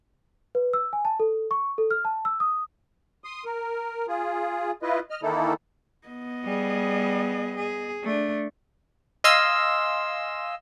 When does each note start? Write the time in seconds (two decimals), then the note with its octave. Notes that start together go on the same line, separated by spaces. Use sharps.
0.55 B4
0.73 E6
0.93 G#5
1.05 A5
1.20 A4
1.51 C#6
1.78 A4
1.91 F6
2.05 A5
2.25 E6
2.40 D#6
3.24 C6 D#6
3.45 A#4
4.08 F4 G#4
4.82 E4 F4 B4 D#5
5.10 D#5 F6
5.23 D#3 E3 A#3 D#4 E4 A4
6.08 B3 D#5
6.44 G3 G#4
7.56 G#4
8.03 A3 D4
9.24 D#5 F5 G#5 C6 E6